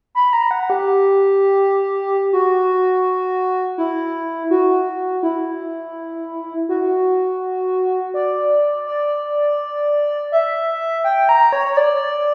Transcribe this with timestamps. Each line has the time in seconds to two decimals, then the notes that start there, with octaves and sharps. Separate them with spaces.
0.15 B5
0.33 A#5
0.51 F#5
0.70 G4
2.33 F#4
3.78 E4
4.51 F#4
5.23 E4
6.69 F#4
8.14 D5
8.87 D5
10.32 E5
11.04 G5
11.29 A#5
11.53 C#5
11.73 C#5
11.77 D5